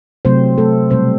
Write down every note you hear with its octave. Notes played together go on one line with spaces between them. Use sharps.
C3 F#3 A3 C4 C5
A3 A4
B2 G3 C4 C5